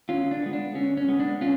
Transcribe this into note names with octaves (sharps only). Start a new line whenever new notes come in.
D3 C#4 F4
D4
G#3 B3
D4
D3 C#4
C#4
G#3 B3
D4
D3 C#4 F4